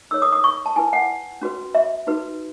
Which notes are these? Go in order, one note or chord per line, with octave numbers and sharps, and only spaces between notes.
D#4 A4 C#5 E6
D#6
D#6
C#6
A5
E4 B4 G#5
F#5
C#4 F#4 B4
E5
D#4 F#4 B4